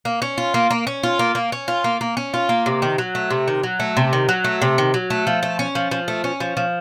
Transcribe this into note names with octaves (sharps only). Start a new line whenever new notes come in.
A#3
C#4
F4
A#3
A#3
C#4
F4
A#3
A#3
C#4
F4
A#3
A#3
C#4
F4
A#3
C3
D#3
F#3
A3
C3
D#3
F#3
A3
C3
D#3
F#3
A3
C3
D#3
F#3
A3
F3
A3
C#4
F3
F3
A3
C#4
F3
F3